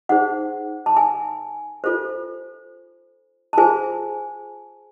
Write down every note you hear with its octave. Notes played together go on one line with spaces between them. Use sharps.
D#4 G#4 C5 F#5
A5
G#5
F4 A4 C5
A5
F4 G#4 C5 G#5